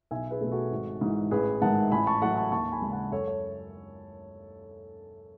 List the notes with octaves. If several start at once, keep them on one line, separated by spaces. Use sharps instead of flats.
B1 E5 G#5
G#4 B4
B2 A3
F#4 A4
G#1
G#2 E3
A1 G#4 B4
G#2 D#3 G#3 F#5 A5
A1 G#5 B5
A5 C#6
A2 F#3 A3 F#5 A5
A5 C#6
D#2 A5 C#6
G#5 B5
C#3 G#3 B5
F#5 A5
F#2 A4 C#5
C#5